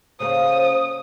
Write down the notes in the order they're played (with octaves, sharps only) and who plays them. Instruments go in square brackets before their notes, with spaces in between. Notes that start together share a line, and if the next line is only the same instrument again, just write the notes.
[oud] C#3 A#3 [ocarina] C5 [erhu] D#6